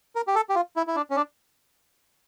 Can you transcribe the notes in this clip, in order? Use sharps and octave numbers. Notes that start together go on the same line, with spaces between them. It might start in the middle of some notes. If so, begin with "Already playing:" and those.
A#4
G4
A4
G4
F4
E4
E4
D4
C#4
D4